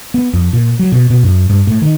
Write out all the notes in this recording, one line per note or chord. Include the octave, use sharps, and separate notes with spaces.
B3
F2
A#2
F#3
B2
B2
F#2
G2
A2
D#3